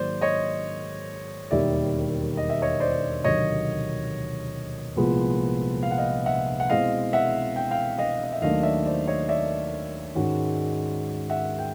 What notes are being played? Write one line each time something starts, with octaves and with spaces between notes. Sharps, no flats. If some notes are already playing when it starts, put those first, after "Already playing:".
Already playing: G#2 D#3 F#3 A#3 C5 D5
C#5 D#5
E1 D#2 D#3 G3 D5 E5
D#5
E5
C#5 D#5
C5 D5
E1 D2 C3 D#3 F#3 C#5 D#5
C2 A#2 F3 G#3 B3
F5
F#5
D#5 F5
E5 F#5
F#5
B2 G#3 C4 E4 D#5 F5
E5 F#5
G5
F5 G5
D#5 F5
D#5
E5
D#2 D#3 F#3 A3 D4 D#5 F5
D5 E5
C5 D5
C#5 D#5
D5 E5
G#2 D#3 G#3 C#4 F#4
E5 F#5
G5